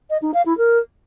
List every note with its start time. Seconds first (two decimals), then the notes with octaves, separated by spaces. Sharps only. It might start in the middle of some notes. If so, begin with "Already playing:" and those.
0.10 D#5
0.22 D#4
0.33 F5
0.45 E4
0.57 A#4